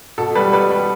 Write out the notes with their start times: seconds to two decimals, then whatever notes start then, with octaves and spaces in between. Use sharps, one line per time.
0.18 B2 A4
0.35 G3 B4
0.53 G3 B4
0.70 G3